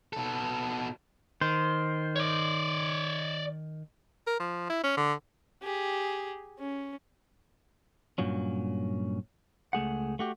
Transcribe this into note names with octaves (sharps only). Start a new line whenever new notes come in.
B2 A4
D#3 C5
C#5 D5
A#4
F3
E4
C#4
D3
G4 G#4
C#4
G2 A#2 F#3 C#4
C#2 A3 G#4 F#5
A3 F#4 G4